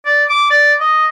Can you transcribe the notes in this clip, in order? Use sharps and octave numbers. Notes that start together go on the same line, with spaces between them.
D5
D6
D5
D#5